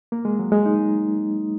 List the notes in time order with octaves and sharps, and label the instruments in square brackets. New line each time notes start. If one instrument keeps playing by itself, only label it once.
[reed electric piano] A#3
G#3
F#3
G#3
D#4